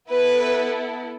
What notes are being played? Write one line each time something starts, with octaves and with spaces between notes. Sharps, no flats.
B3 E4 A4 B4